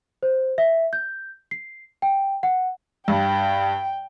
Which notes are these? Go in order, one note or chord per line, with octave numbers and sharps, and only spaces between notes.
C5
E5
G6
C7
G5
F#5
G2 G5